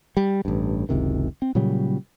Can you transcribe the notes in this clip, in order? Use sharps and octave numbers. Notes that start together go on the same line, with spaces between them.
G3
A1 G2
F#1 C#2 C3 D#3
C4
A#2 C#3 F#3 G3